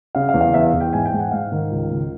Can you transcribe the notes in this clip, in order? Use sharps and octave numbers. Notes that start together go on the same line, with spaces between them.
C#3 F5
F5
E2
F5
E2 E5
F5
E2
G5
G#2 G#5
G5
G#2
F#5
G#2 F5
D#3
C#2
C#2